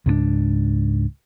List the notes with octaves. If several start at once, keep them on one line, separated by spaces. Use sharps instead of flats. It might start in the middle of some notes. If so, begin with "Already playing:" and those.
C#2 G#2 C4 D4